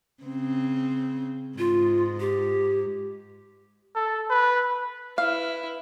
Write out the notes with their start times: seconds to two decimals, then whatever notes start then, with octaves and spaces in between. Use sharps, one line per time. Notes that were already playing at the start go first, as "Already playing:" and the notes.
0.24 C#3 C4
1.58 G#2 F4
2.20 G4
3.95 A4
4.30 B4
5.18 E4 B4 F5